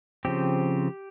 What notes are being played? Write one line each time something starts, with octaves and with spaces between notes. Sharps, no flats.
C#3 F3 C4 G4